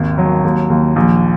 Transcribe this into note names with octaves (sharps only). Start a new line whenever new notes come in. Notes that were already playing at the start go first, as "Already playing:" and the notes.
Already playing: G#1 D#2
F#3
D#2
D#2
A#1